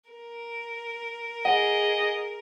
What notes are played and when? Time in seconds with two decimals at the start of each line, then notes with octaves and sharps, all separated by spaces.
0.10 A#4
1.45 G#4 D#5 F#5